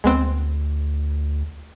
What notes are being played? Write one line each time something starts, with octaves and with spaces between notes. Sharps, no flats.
D2 G#3 B3 C4